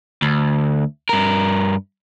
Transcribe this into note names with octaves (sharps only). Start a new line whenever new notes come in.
D2
G2 A#4